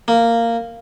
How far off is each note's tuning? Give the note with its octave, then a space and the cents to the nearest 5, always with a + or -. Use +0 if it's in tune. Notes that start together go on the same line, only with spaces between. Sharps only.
A#3 -10